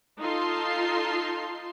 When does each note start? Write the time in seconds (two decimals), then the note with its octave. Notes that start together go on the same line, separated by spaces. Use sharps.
0.20 D#4 F4 A4 C6